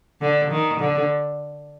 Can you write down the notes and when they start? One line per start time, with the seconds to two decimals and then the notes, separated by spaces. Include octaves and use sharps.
0.21 D3
0.51 D#3
0.80 D3